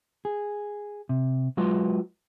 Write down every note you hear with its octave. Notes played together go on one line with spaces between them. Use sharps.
G#4
C3
F#3 G#3 F4 F#4 B4 C6